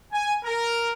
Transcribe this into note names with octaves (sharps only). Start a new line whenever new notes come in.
G#5
A#4